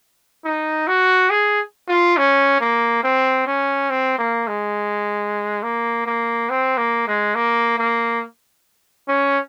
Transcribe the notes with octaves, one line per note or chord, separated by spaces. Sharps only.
D#4
F#4
G#4
F4
C#4
A#3
C4
C#4
C4
A#3
G#3
A#3
A#3
C4
A#3
G#3
A#3
A#3
C#4